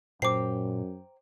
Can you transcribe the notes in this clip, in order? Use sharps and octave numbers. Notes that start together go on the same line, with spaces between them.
F#2 A#2 C5 G5 A#5 D6 C7